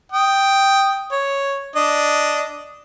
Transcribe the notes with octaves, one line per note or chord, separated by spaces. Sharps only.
G5 D#6
C#5
D4 D#5